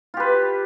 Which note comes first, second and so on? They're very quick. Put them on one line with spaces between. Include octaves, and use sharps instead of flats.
F4 G4 B4